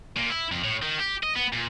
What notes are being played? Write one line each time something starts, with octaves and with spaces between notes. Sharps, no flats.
A#2
E4
F2
A2
D#3
G4
D#5
B3
A#2